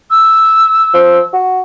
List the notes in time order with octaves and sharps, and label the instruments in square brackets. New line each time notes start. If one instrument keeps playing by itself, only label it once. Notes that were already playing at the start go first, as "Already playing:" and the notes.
[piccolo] E6
[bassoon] F3
F#4